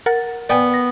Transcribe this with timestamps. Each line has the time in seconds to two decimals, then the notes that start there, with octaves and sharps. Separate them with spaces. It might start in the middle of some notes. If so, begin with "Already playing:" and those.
0.06 A#4 F#5 A6
0.49 B3 D5 G5 G#5
0.74 A#6